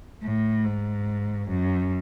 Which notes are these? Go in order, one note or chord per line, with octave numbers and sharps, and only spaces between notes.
A2
G#2
F#2